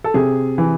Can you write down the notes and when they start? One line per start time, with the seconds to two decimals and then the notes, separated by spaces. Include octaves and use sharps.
0.04 A4
0.14 C3 G#4
0.58 E3